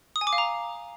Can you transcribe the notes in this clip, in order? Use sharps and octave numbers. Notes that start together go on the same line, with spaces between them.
D#6
G#5
D6
F5
A#5